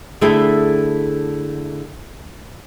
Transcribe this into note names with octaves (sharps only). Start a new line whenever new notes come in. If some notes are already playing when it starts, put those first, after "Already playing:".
D3 A3 E4 G#4 A4 G5